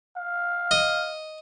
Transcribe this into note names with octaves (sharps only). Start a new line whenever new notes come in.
F5
D#5